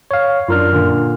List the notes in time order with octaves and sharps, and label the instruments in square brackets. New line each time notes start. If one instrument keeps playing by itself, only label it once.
[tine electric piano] C#5 F5
[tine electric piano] F#2 A#4 F6 [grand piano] D4 F4
[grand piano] A#2 D3 A#3